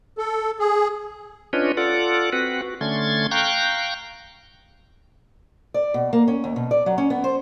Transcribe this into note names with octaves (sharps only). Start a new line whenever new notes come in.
A4
G#4
C#4 D4 F4 B4 C#5 D#5
F4 A4 D5 F#5
C4 F#4 B4 F#5
F#4
D3 A3 C#4 C6 G#6 A6
F5 G5 A#5 C#6 F#6 G6
D5
B2
A#3
C#4
D#2
B2
D5
F#3
C#4
B3
C5